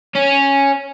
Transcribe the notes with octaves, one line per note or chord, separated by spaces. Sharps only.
C#4